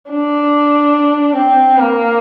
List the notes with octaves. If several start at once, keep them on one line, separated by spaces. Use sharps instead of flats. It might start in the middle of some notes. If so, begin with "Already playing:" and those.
D4
C4
A#3